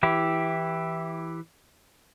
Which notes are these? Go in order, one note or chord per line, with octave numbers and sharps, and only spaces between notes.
E3 E4 G4